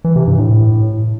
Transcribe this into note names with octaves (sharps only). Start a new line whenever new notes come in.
E3
C3
G2
A2